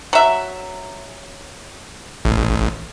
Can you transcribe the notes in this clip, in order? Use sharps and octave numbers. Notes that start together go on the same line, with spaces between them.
F#3 E5
A1